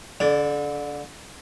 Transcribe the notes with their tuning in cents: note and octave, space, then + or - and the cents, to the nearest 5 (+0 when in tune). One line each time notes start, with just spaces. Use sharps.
D3 -30 D5 +15